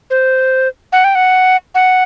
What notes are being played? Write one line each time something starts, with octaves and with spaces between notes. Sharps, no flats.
C5
F#5
G5
F#5
F#5